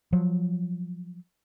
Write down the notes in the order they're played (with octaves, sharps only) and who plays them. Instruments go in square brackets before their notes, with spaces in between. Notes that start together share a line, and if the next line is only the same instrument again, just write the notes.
[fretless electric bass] F3 F#3